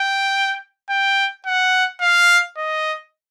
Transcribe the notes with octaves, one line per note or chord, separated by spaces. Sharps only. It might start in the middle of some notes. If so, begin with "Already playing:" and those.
Already playing: G5
G5
F#5
F5
D#5